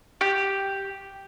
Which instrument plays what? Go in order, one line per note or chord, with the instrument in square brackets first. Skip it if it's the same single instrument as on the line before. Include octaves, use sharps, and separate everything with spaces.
[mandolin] G4